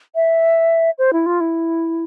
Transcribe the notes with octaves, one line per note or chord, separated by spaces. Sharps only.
E5
C5
E4
F4
E4